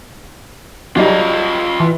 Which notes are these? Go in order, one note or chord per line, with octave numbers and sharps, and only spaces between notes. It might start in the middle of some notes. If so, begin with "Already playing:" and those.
F#3 G3 D#4 F4 D#5
E3